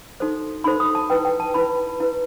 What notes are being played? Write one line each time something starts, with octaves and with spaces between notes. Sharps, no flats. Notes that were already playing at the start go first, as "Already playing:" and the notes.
D#4 F#4 A4 C5
D#4 F#4 A4 C5 B5
D#6
A5
E4 B4 G5
G5
A5
E4 B4 B5
E4 B4